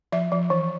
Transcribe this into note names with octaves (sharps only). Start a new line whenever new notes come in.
F3 E5
F3
E3